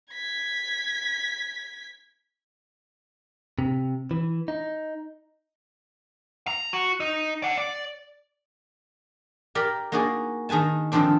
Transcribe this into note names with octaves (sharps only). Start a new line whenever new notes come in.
G#6 B6
C3
E3
D#4
A#5
F#4
D#4
D5 F#5
D5
G4 A#4 D5 B5
A#3 D#4 F#4 G#4 D5
D#3 G#4 B4 G#5 A5
D3 D#3 F3 C4 D4